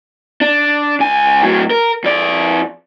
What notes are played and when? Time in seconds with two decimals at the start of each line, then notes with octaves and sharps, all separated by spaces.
0.41 D4
1.00 C#2 G#5
1.43 A2 F#3
1.70 A#4
2.04 F2 D5